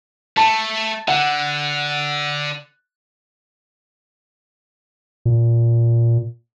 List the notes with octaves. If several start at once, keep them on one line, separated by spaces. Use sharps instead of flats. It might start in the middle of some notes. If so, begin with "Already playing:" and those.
A3 A5
D3 F#5
A#2